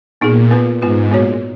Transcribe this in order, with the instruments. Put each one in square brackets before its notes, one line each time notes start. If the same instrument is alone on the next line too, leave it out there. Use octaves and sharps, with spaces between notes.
[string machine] A#2 [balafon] B3 D#4 G#4
[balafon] B3 F4 B4
[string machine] G#2 [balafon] B3 F4 B4
[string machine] A#2 [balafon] B3 F#4 C#5